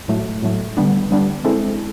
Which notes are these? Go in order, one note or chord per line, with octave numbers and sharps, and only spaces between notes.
A2 F#3 A3
A2 F#3 A3
D3 G3 B3 D4
D3 G3 B3 D4
G#3 C4 E4 A4